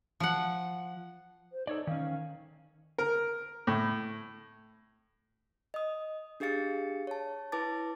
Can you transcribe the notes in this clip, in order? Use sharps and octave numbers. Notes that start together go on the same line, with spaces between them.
F3 F#5
C5
D#4 A4 C#5 D5
D#3 C#4 F5
A#4
A2
D#5 D#6
D4 G4 G#4 F5 A6 C#7
C#5 A5
E4 B4 A5 D6 A6